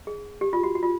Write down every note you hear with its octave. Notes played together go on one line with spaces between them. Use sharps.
G#4
G4
F4
F#4
F#4
F4